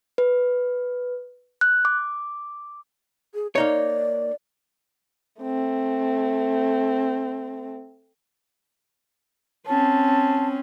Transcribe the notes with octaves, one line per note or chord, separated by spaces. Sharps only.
B4
F#6
D6
G#4
A#3 D#4 C#5 D5
A3 C4
C4 C#4 A5